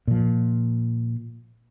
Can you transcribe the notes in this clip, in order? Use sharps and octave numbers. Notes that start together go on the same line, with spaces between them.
A#2 F3